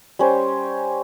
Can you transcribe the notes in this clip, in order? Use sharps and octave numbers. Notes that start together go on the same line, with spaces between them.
G3 C#4 C5